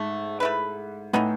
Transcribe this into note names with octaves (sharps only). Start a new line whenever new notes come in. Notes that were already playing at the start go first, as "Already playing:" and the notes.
Already playing: G#2 A3
A3 E4 B4
A2 E3 B3 D#4